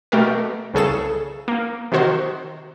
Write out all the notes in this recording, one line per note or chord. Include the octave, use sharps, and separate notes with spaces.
B2 A3 G4 A#4
C2 C#3 G#4 A4 E7
A#3
C3 D#3 F#4 C5